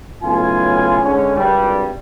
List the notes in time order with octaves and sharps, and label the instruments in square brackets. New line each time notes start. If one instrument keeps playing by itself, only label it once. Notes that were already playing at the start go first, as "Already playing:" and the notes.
[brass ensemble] B1 A2 C#3 F4 G#5
G#2 D3 C#4
G#1 G2 G3